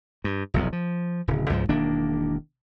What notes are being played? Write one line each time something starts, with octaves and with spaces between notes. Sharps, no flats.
G2
F1 B1 E2
F3
D1 C#3
C#2 G#2 F3
E1 D#3 A#3 D4